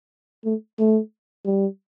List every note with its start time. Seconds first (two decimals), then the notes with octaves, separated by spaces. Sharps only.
0.45 A3
0.79 A3
1.46 G3